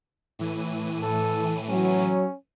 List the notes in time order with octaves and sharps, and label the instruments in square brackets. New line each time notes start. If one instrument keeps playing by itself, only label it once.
[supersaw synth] A2 E3 D#7
[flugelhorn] A4
[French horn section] F#3 [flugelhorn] C#4